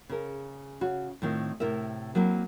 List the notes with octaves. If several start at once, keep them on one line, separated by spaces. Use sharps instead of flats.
C#3 A#4
C#3 F#4
A2 D#3 C4 F4
A2 C3 E4 A#4 E5
F#3 A#3 C4 E4